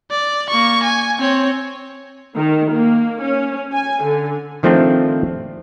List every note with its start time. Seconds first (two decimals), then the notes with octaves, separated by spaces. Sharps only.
0.11 D5
0.50 A#3 C#6
0.83 G#5
1.19 C4 C#5
2.36 D#3
2.73 A#3
3.22 C#4
3.72 G#5
4.04 D3
4.63 D#3 F3 A3 C4 D4